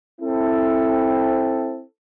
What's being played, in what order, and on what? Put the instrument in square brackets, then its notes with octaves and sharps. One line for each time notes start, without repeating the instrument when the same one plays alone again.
[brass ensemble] C4 E4 A4